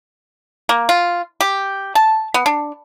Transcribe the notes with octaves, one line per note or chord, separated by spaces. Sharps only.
A#3
F4
G4
A5
B3
D4